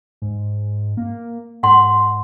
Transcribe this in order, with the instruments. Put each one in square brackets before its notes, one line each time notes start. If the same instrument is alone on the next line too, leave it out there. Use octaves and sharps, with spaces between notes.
[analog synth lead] G#2
A#3
[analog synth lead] G#2 [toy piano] F#5 C6